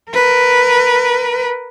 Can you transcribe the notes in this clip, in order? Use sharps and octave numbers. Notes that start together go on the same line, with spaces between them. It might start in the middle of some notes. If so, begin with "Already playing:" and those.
A#4 B4